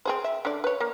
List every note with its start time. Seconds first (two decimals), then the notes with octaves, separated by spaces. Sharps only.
0.05 C4 G#4 C5
0.24 E5
0.45 D3 D5
0.64 B4 C#5
0.80 A#3